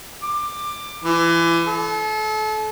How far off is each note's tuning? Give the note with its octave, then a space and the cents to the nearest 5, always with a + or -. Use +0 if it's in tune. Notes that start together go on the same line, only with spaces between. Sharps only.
D6 +15
E3 +30
A4 -35